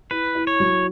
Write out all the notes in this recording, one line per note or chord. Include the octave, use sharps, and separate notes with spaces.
E4 B4
E4
C#5
F#3